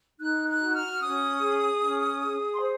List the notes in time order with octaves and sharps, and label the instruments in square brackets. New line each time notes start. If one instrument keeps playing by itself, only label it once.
[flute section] D#4 F#6
F#6
F#4
F6
C#4 D#6
G#4
C#4
G#4
C6
C5